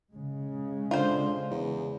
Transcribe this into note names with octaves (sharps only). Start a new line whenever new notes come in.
C#3 G#3
D3 F4 C5
E2